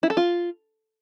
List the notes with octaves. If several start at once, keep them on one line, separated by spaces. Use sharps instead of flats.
E4
A4
F4